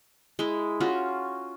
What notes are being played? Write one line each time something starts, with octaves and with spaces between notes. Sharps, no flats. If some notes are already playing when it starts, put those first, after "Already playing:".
G#3 E4
C#4 F4 F#4